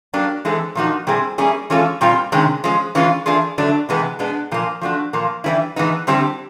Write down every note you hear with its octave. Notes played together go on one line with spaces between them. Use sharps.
F#3 A#3 D4 G4
E3 G#3 C4 E4 A4
A#2 F3 A#3 D#4 F#4
A#2 G3 C4 E4 G#4
G3 A#3 C#4 E4 G#4
E3 G#3 C#4 F4 A4
A#2 G3 C4 F4
C3 D#3 G#3 C#4
F3 G#3 C#4
E3 G#3 C#4 F4
E3 A3 D4 F4 G#4
D3 F#3 A3 D4
C3 E3 G#3 B3
B2 G#3 B3 D4
A#2 F3 A#3
F3 A3 D4 F#4
A#2 F3 A#3
E3 G3 A#3 C#4 E4
A2 E3 G#3 B3 D#4
D3 G3 C4 E4 G4